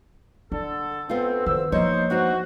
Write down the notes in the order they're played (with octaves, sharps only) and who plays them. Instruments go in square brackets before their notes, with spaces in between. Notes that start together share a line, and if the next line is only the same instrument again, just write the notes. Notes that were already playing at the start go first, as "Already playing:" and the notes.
[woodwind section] D3 A4 [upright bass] D4
[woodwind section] F2 C4 [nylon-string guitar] B3 F4
[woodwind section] D2 C4 E6 [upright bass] D#3
[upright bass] F3 A#3 [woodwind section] D#4 C5 [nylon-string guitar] C#5
[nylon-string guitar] D4 D#4 C5 [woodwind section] F#4